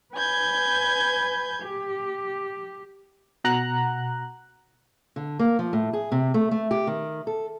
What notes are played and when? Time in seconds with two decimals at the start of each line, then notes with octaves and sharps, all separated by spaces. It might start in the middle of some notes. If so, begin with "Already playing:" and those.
0.14 B4 G#5 G6 G#6
1.62 G4
3.44 B2 F#5 A#5 F#6
5.16 D3
5.39 A#3
5.59 F3
5.73 A2
5.93 G#4
6.12 C3
6.34 A3
6.51 A3
6.71 G4
6.87 D#3
7.27 A4